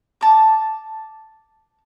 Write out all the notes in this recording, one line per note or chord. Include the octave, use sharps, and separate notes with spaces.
A5 D6